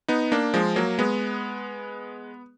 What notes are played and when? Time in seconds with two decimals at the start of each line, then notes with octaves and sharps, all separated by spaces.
0.08 B3 D#4
0.32 A#3 D4
0.54 F3 G#3
0.76 F#3 A#3
0.99 G#3 B3